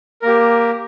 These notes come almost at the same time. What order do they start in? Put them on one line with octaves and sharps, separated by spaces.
A#4 A#3 G4